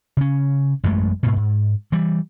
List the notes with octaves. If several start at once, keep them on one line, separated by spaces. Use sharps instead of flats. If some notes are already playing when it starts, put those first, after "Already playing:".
C#3 C#4
A1 F#2 G#3 A3
G#2 B2
G#2
E3 G3